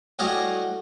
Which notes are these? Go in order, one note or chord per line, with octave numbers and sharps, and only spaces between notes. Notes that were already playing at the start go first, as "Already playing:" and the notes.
A2 G3 F#4 D#5 F5 G#5